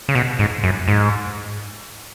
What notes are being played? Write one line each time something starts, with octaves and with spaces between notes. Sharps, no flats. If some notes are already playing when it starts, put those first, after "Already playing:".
C#3
B2
G#2
F#2
G#2